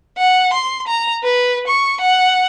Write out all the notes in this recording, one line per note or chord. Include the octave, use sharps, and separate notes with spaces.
F#5
C6
A#5
B4
C#6
F#5